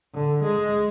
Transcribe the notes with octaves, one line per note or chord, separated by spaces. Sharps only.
D3
G#3